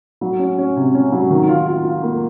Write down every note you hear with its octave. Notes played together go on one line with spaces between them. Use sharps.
F#3
C#4
C#4
C3
C#4
F#3
D#3
F4
F4
F4
A#3